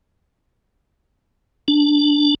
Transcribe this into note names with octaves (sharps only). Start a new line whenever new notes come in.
D4